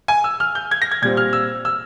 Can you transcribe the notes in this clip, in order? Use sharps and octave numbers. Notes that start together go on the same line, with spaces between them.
G#5
E6
F6
G6
G#6
A#6
G#6
A#2 G3 C4 G#6
F6
E6
E6